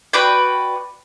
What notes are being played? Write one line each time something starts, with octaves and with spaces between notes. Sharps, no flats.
F#4 B4 D5 G5